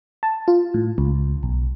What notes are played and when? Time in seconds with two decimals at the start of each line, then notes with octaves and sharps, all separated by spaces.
0.23 A5
0.48 F4
0.74 A2
0.98 C#2
1.43 B1